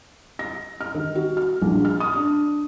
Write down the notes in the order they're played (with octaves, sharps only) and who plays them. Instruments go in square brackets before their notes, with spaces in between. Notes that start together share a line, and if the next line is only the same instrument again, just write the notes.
[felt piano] A#6
F6
D#3
F#4
F6
A#1
F6
D#6
D4